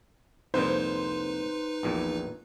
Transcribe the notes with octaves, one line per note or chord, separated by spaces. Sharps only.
C2 F2 A#2 D#4 B4 C5
A#1 E2 A#2